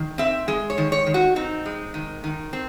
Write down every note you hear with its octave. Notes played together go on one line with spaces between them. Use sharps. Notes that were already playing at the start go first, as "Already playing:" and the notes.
Already playing: D#3
C4 E5
G#3
C#5
D#3
C#5
D#3
F#4
C4 D#4
G#3
D#3
D#3
C4